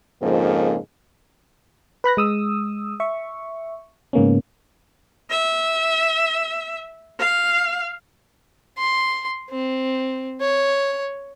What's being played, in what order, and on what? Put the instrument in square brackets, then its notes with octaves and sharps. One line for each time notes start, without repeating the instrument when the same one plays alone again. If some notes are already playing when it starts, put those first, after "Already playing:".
[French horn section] F2 G#2 C#3 F3 A#3
[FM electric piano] B4 B5 F#6 A#6
G#3 D#6 E6
E5 C#6
G#2 C#3 A#3 B3 C#4
[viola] E5
F5
[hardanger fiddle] C6
C4
C#5